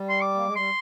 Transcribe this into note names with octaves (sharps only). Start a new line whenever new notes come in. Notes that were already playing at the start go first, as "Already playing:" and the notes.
Already playing: G3
C6
D6
A#3
G#3
G3 C6